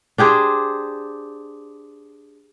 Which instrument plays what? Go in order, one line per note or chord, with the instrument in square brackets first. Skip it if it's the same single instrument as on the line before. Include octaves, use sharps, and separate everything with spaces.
[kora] D4 G4 G#4 C5